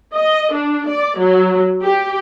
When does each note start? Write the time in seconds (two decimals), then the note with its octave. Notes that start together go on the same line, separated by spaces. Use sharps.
0.14 D#5
0.53 D4
0.89 D5
1.19 F#3
1.82 G4